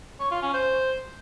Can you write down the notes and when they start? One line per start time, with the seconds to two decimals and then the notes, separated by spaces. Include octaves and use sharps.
0.20 C#5
0.31 F4
0.42 C#4
0.54 C5